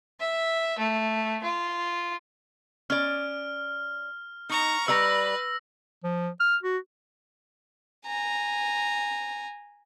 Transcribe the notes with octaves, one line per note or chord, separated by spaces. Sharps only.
E5
A3
F4
C#4 D5 F6
D#4 A#5 C#6
G3 B4 D5 A#5 E6 A#6
F3
F6
F#4
G#5 A#5